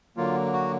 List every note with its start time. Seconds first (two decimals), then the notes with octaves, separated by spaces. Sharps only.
0.17 D3 F#3 A#3 F4
0.53 F#4